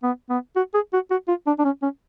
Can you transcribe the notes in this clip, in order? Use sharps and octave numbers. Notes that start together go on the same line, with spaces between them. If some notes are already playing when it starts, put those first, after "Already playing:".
B3
B3
F#4
G#4
F#4
F#4
F4
D4
D4
C#4
C#4